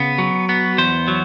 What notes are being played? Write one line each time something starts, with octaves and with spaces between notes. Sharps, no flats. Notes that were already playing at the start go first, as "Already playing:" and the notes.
Already playing: C#3 B3
F#3
B3
E2 C5
F#3